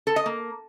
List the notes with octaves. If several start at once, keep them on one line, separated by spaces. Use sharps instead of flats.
A4
D#5
A#3